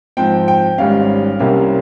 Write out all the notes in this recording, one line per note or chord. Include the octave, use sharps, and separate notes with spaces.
G#2 F3 C4 G5
G5
G#1 G#2 G3 C#4 F5
C2 C3 G3 A#3 C#4